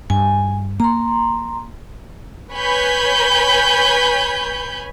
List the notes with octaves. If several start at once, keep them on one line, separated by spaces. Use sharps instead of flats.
G2 G#5
A#3 A#5 C6
B4 C#5 G#5 B5 G6